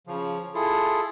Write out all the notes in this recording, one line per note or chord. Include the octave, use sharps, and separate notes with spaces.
C#3 F3
E4 F4 G#4 A4